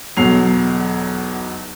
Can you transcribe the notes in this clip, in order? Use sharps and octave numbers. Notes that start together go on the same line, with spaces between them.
B1 E2 F#3 C7 F7